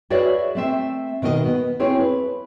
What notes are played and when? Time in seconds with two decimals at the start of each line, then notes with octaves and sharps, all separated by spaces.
0.10 F#4 G#4 B4 C#5 D5 E5
0.55 A3 C4 E5
1.22 B2 D#3 A#4 C5 D#5
1.45 B3
1.80 C4 E4 G#4 C#5
2.00 B4